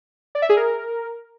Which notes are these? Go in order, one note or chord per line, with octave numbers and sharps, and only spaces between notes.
D5
E5
G#4
A#4